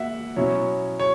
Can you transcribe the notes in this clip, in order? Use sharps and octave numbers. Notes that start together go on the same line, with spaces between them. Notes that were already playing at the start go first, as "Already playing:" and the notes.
Already playing: A#3 E5 F#5
B2 F#3 C#4 E4 C#5
C#5